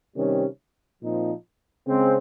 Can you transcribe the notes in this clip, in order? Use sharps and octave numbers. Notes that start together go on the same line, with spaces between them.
C3 D#3 G3 C#4
A#2 F3 C4 D#4
C#3 G#3 C4